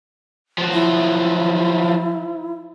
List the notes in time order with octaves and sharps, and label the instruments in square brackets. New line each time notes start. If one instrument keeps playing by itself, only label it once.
[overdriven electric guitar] F3 F#3
[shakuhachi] E4